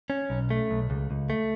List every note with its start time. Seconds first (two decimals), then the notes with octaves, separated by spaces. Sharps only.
0.10 C#4
0.30 B1
0.50 A3
0.71 B1
0.90 C#2
1.11 C#2
1.30 A3